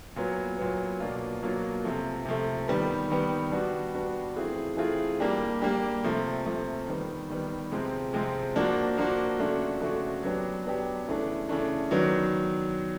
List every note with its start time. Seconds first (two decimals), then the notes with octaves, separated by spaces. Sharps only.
0.16 A#2 F#3 B3
0.58 A#2 F#3 B3
1.00 B2 F#3 A#3 D4 F4
1.42 B2 F#3 A#3 D4 F4
1.84 C3 F3 A3
2.25 C3 F3 A3
2.68 D#3 G3 B3
3.10 D#3 G3 B3
3.52 G3 B3 D4 F#4
3.94 G3 B3 D4 F#4
4.36 E3 A3 C4 F4 G#4
4.77 E3 A3 C4 F4 G#4
5.20 G3 A#3 D4 G4
5.62 G3 A#3 D4 G4
6.04 C3 F3 A3
6.45 C3 F3 A3
6.88 D#3 G3 B3
7.30 D#3 G3 B3
7.72 C3 F3 G#3 C4
8.13 C3 F3 G#3 C4
8.56 F3 A#3 D4 F#4
8.97 F3 A#3 D4 F#4
9.39 C#3 F3 A3 D4 F#4
9.81 C#3 F3 A3 D4 F#4
10.23 F#3 B3 D4 G4
10.66 F#3 B3 D4 G4
11.07 C#3 E3 A3 D4
11.49 C#3 E3 A3 D4
11.91 D#3 F#3 B3 D4